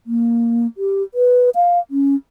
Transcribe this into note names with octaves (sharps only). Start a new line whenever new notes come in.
A#3
G4
B4
F5
C#4